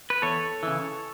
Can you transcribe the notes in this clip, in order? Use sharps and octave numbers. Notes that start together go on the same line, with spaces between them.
B4
E2 A4 C#5
C#3 E3